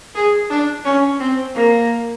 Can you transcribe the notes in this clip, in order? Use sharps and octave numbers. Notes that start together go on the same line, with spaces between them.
G#4
D4
C#4
C4
A#3